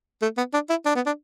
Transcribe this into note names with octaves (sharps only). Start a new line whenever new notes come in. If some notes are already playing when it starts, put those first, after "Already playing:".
A3
B3
D4
E4
D4
B3
D4